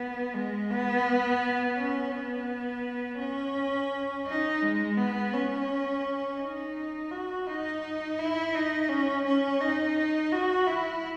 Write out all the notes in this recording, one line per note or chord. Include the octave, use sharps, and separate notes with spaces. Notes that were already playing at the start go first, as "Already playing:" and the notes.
Already playing: B3
G#3
B3
C#4
B3
C#4
D#4
G#3
B3
C#4
D#4
F#4
D#4
E4
D#4
C#4
C#4
D#4
F#4
E4